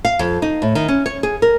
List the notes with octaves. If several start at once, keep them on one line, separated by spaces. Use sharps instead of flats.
F5
F2
D#4
A2
D#3
C#4
C#5
G#4
A#4